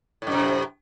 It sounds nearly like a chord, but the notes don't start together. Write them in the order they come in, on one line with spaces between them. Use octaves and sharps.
A2 F#2 C3